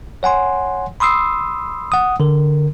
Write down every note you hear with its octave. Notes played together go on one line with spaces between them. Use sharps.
C#5 F#5 G#5 C6
B5 C6 D#6 E6 C7
F#5 D#6
D3 A#4